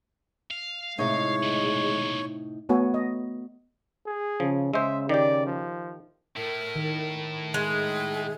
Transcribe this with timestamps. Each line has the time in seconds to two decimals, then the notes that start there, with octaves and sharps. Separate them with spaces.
0.51 F5
0.98 A2 C3 G#3 D#4 C#5
1.43 B2 D#3
2.69 A3 B3 F#4 C#5 G#5
2.94 D#5
4.07 G#4
4.40 C#3 F3
4.74 C#3 G#3 C5 E5
5.09 D#3 G4 D5
5.47 F3
6.37 A2 E4 A#4
6.76 D#3
7.54 G#3 G#4